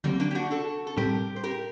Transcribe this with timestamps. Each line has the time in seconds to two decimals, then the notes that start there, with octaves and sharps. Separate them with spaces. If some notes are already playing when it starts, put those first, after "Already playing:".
0.04 D3 F#3 G3 A#3 C4
0.20 A#3 D4
0.31 G4
0.35 D4 F#4
0.51 F#4 A4
0.87 A4
0.97 A2 G3 C4 G4 A#4
1.36 C5
1.43 G4 A#4